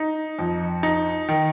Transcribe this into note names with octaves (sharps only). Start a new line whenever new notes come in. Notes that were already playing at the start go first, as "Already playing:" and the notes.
Already playing: D#4
F2
D#4
D#3